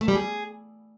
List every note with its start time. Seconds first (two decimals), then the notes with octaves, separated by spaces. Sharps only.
0.01 A3
0.08 G3
0.15 G#4